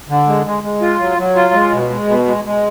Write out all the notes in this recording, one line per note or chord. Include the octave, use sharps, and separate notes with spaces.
D3
G#3
G#3
G#3
F4
F#3
F#3
F4
G#3
B2
G#3
B2
G#3
G#3